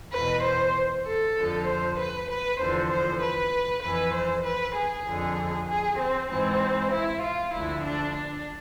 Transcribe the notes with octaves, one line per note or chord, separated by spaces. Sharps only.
E2 B2 B4
C5
A4
F2 D3 F3
C5
B4
B4
E2 D3 F3 C5
C5
B4
F2 E3 B4
C5
B4
G#4
F2 D3 F3
G#4
C4
G#2 E3 C4
E4
F4
D2 D3 F3 E4
D4
D4